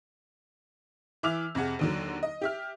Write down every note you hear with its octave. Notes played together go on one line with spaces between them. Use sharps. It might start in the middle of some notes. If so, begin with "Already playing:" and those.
E3 E5 D6 E6 F6 F7
F2 C3 G#4 F#5
D#2 D3 F#3
D#5
G4 E5 F6